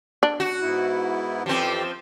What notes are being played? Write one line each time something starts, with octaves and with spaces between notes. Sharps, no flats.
D4
F#4
G#2 B3 E4
F2 E3 F3 C4 G4